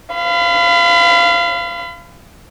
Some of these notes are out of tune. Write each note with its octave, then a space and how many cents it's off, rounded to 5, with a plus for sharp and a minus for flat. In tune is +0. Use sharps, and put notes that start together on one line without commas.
F5 -20 B5 +30